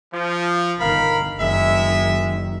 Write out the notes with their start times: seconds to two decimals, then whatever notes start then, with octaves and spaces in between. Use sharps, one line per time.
0.13 F3
0.80 G1 D#3 A#4 F5 B5
1.40 F#1 D#3 G#3 E5